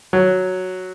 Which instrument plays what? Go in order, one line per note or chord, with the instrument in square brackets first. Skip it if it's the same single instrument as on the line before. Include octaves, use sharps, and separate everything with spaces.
[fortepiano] F#3